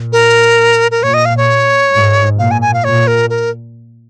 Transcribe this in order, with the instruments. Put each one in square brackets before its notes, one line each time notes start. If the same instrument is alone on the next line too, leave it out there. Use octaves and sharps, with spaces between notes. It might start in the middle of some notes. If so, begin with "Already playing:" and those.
Already playing: [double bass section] A#2
[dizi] A#4
A#4
[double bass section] A#2 [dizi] C#5
[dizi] D#5
F5
C#5
[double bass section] G#2
[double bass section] A#2 [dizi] F5
[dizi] G#5
G#5
F5
[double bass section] A#2 [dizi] C#5
[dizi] A#4
A#4